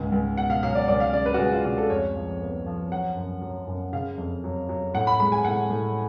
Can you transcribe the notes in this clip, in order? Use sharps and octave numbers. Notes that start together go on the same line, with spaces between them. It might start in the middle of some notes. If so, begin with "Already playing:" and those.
Already playing: C#2 G#2
C#2
B2 F#5
F5
F#3 F5
D5
C#2 D5
F5
C#3 D5
B4
F#4
C#2 G#4
F4
C#3 F#4
A4
F2 C#5
F3
B3
F3
F#3 F#5
F#2
F#3
F#2
C#3 F5
F2
F#3
F#3
A2 F#5
B5
G#3 B5
G#5
A2 F#5
A2